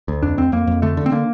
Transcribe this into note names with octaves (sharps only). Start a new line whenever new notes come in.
D2
F2 D4
F2 C4
F2 A#3
F2
D3 A3
D3
C4
D3 A#3